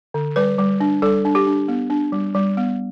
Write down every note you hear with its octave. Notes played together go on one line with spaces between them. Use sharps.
D3
G3 B4
G3
D4
G3 A4
D4
G4
D4
B3
D4
G3
G3
B3